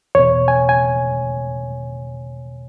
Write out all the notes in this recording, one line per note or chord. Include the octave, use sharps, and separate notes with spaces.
E2 B2 C#5
G#5
G#5